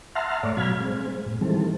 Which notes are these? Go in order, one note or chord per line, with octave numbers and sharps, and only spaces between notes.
E5 F#5 A5 A#5 C6 F6
G#2 A3 C#5 D5
B2 F#3 F5 B5 F6 G#6
G#3 C4
A2
D#3 E3 G3 G#3 C4 A4